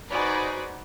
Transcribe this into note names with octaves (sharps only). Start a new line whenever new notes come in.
D#4 F#4 G#4 B4 C5 D5